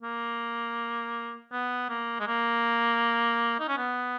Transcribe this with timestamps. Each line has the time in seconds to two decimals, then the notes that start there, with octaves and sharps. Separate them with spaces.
0.03 A#3
1.52 B3
1.90 A#3
2.20 G#3
2.27 A#3
3.60 D#4
3.68 C#4
3.77 B3